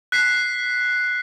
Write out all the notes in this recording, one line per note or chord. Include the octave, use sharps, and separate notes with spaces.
F#6 B6 C7